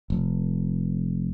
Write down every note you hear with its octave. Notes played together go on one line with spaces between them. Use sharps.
F1